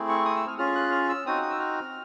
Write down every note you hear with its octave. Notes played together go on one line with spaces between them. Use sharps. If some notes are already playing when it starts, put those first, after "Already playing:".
Already playing: A3 C4 E4 G#4
C#6
D#6
E6
F6
C#4 F4 G#4 F6
F#6
F6
E6
C4 D#4 F#4 D#6
D#6
E6
F6